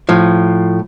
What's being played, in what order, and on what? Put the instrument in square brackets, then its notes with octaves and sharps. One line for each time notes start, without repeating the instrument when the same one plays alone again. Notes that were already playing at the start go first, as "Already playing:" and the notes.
[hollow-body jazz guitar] A2 F3